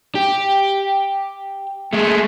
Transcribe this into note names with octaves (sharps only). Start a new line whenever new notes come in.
G4
G#3 A3